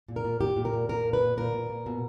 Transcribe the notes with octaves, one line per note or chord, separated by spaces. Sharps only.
A#2
A#4
A#2
A#2 G4
A#2
A#4
A#2
A#2 A#4
A#2
B4
A#2
A#2 A#4
A#2
A#2
B2